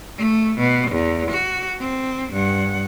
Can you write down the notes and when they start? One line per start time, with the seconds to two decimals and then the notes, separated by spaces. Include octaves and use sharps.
0.18 A3
0.59 B2
0.91 E2
1.31 F#4
1.81 C4
2.33 G2 F#5